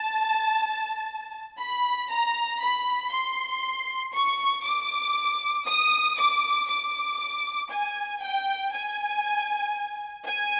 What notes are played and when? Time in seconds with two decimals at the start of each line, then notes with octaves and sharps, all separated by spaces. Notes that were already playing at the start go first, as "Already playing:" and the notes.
Already playing: A5
1.59 B5
2.10 A#5
2.61 B5
3.12 C6
4.14 C#6
4.65 D6
5.67 D#6
6.18 D6
6.69 D6
7.71 G#5
8.22 G5
8.73 G#5
10.26 G#5